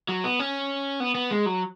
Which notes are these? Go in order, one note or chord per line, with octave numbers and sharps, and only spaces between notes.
F#3
B3
C#4
B3
B3
G#3
F#3